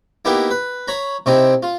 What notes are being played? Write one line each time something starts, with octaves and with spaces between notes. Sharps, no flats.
A#3 B3 D#4 E4 G4
B4
C#5 A#5 B5
C3 C4 D#4 E4
F4